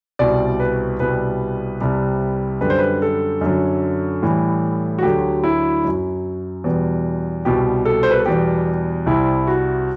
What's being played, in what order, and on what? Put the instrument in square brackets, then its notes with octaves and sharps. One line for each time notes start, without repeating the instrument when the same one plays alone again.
[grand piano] C2 B2 G3 D5
B4
C2 B2 G3 B4
C2 C3 G3
F#2 D3 G3 B4
C5
B4
A4
F#2 D3 F#3
A2 E3 G3
F#4
D2 D3 F#3 G4
E4
F#2 F#3
E2 B2 G3
C2 B2 G3 G4
A4
C5
B4
A4
E2 B2 G3 G4
C2 C3 G3 E4
F#4